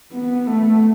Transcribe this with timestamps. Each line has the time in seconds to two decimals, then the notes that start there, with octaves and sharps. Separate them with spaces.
0.12 B3
0.47 A3